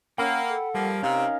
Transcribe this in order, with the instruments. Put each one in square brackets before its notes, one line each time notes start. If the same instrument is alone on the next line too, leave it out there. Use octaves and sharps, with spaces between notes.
[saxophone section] A#3 [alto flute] C#4 [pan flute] F#5 [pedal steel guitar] G5 B5 E6
[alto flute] A4
[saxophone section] F3 A#3 [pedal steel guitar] G3
[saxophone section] C3 [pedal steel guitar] C#4 D#4 A#4 [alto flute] F5 [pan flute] A#5